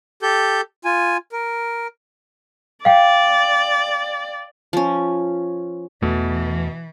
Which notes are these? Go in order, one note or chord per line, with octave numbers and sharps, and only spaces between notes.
G4 A4 G6
F4 G#5
A#4
D5 F5 G5
F3 C#4
E2 B2 E3 A3